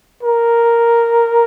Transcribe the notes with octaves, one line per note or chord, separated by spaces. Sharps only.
A#4